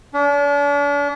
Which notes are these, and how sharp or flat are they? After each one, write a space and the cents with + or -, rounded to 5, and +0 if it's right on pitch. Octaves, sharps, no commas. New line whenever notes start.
D4 -40